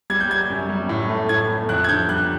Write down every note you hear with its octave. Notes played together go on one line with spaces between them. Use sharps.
G3 G#6
G6
G3 G#6
F#2
G3
A2
A3
A2 G#6
A3
F2 F#6
G#6
D3 G6
G3 F#6